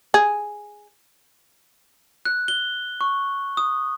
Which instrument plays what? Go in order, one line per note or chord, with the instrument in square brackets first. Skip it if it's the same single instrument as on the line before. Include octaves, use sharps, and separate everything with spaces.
[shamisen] G#4
[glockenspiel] F#6
G7
C#6
D#6